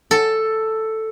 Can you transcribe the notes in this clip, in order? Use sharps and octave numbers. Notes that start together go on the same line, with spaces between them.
A4